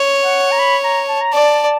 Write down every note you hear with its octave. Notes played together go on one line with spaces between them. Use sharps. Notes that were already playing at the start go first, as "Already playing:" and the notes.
Already playing: C#5
F#5
A#5
B5
A#5
A5
A#5
D5 A5